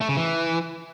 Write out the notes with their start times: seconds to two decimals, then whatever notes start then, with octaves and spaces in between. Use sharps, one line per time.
0.01 A3
0.09 C#3
0.17 E3